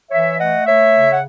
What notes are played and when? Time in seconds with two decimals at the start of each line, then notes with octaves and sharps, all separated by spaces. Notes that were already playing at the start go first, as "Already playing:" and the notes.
0.11 E3 C#5 E5
0.39 A3 D#5 F#5
0.67 A3 C#5 E5
0.95 C#3
1.13 F#5